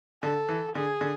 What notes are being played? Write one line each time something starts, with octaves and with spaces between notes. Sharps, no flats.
D3 A4
E3
D3 G#4
D3